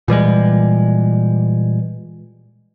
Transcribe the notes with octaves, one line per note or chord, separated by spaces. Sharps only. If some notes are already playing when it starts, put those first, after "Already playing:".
A#2 E3 G3 G#3